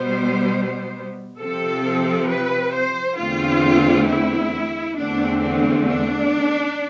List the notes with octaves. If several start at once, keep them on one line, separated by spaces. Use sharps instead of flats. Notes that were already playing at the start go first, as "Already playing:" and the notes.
Already playing: B2 G3 B3 C5
C3 F3 C4 A4
B4
C5
E2 D3 A3 C4 F4
E4
E2 D3 A3 C4 D4
D4
D4